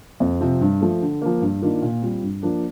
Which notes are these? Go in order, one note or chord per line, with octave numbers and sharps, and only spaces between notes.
F2
C3 F3 C4
G2
F3 A3
D3
F3 A#3
G2
D#3 A#3 D4 F4
A#2
G3 C4 F4
G2
F3 A#3 D4